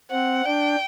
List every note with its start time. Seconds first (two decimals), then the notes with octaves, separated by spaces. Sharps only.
0.11 C4 F#5
0.45 D4 G5